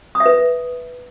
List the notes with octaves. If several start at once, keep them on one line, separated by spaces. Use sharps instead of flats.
D#6
E5
B4